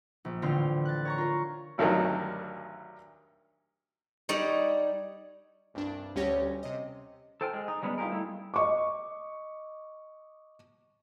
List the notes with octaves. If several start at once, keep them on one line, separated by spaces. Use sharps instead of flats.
A#1
A1 D3 C4 F4 C6 F6
F#6 A6
C#5 A#5 C#6
F4 A#4
G#1 D2 G2 D#3 F#3
G3 D#4 C#5 D5
C2 G2 D4
D2 G3 C#4 G4 C#5 A#6
C3 D#5
A4 C5 G5 G#5 F6
G#3
D#4
G3 G#3 B3 C#4 D4
D#4 F4 G4 G#4 A#4
G3 A3 E4 G4
D#5 C#6 D6